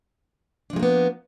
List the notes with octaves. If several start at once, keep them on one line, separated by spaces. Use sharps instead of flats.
F3 G#3 A#3 B3 D4